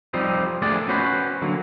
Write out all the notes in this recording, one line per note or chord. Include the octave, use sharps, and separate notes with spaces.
F3 G3 C4 D#4
F3 A3 A#3 D4 G#4 D5
C#4 F#4 B4 C5
D3 F#3 A#3